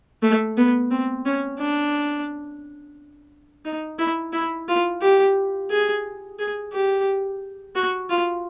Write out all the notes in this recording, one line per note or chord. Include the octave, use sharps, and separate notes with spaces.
A3
B3
C4
C#4
D4
D#4
E4
E4
F4
G4
G#4
G#4
G4
F#4
F4